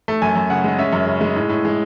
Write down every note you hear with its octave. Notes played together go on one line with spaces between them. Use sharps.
A3
F#2 G#5
F#2
C#3 F#5
G#3
C#4 E5
F#2
C#3
G#3
A2
A2
G#3